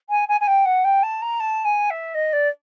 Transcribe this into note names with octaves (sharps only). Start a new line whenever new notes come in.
G#5
G#5
G#5
G5
F#5
G5
A5
A#5
A5
G#5
E5
D#5
D5